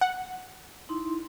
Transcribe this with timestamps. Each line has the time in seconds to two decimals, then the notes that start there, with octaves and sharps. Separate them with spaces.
0.01 F#5
0.89 D#4 E4 C6